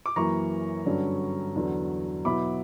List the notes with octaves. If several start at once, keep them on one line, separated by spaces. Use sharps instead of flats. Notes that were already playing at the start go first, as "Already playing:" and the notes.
D6
F#2 E3 A#3 A#5 C#6
G2 D3 F#3 C#4
E2 D3 F#3
B2 F#3 B3 E4 B5 D6